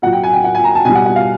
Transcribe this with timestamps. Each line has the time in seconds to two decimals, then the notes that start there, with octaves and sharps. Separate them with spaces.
0.02 A#2 F#3 F#5
0.13 G5
0.23 G#5
0.33 G5
0.44 F#5
0.55 G#5
0.64 A#5
0.75 A5
0.85 B2 G3 G#5
0.95 F#5
1.05 F#5
1.16 F5